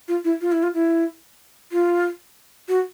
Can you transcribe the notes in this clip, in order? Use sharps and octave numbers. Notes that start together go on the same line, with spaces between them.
F4
E4
F4
E4
F4
E4
F4
F#4